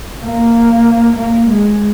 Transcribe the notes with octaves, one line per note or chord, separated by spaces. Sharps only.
A#3
A#3
G#3